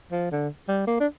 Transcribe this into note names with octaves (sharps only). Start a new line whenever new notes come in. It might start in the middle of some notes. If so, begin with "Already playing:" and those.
F3
D3
G3
A#3
D4